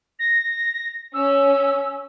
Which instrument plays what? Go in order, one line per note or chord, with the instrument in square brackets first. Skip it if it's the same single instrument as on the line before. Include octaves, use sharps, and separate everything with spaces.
[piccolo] A#6
[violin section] C#4 [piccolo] E6